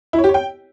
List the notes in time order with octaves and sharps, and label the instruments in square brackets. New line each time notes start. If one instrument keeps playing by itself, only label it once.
[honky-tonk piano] E4
C#5
G4
C#5
G5